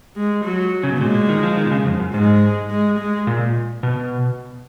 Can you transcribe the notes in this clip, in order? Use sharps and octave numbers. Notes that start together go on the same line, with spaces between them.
G#3
F#3
C#3
B2
A#2 G#3
A#2
D#3
F3
D#3
B2
C#3
F2
F#2
G#2 G#3
G#3
G#3
A#2
B2